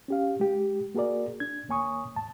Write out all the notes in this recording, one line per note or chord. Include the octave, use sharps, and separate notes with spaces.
C#4 G4 F5
G#3 G4
A#3 F#4 G#4 A#4 D5
D4 G#6
D#2 A#3 C#5 G#5 C#6 D#6
D#2 G#2 A5